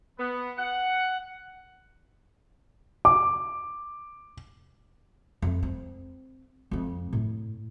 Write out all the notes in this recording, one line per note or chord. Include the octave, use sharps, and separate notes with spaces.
B3
F#5
D6
F2
C4
F2 C4
A2